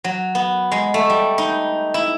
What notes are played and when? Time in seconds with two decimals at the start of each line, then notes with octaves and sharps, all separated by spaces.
0.04 F#3
0.35 B3
0.72 G#3
0.94 A3
1.10 G3
1.38 D#4
1.94 E4